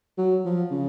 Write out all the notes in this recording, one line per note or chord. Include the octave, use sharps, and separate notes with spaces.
F#3
F3
C#3